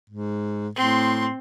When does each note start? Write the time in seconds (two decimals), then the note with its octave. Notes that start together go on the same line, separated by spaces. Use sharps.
0.10 G#2
0.75 A2 C4 C6